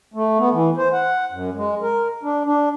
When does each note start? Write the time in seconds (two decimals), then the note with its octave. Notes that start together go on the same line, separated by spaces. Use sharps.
0.14 A3
0.38 B3
0.53 E3
0.77 C5
0.92 F#5
1.32 F#2
1.55 G#3
1.82 A#4
2.23 D4
2.45 D4